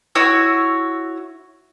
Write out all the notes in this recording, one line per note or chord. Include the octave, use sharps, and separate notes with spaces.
E4 F#4 C#5 E6